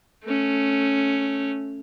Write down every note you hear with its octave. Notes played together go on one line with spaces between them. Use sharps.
A3 C#4